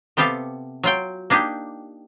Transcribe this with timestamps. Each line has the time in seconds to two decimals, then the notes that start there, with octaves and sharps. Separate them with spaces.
0.17 C3 B3 G4 A4 F5 A5
0.83 F#3 F4 G5
1.30 A#3 D4 D#4 G4